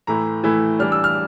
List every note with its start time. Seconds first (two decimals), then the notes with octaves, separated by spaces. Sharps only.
0.07 A2 E3 A3 E4 A#5
0.43 A2 E3 A3 E4
0.79 E3 G3 D4 F6
0.92 E6
1.04 F6